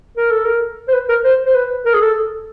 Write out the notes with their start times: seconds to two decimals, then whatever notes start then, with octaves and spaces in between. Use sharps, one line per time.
0.17 A#4
0.31 A4
0.45 A#4
0.88 C5
0.93 B4
1.09 A#4
1.24 C5
1.46 C5
1.55 B4
1.86 A#4
1.94 G#4
2.01 A4